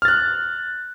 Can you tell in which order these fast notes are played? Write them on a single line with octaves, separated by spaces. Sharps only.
F6 A6 F#6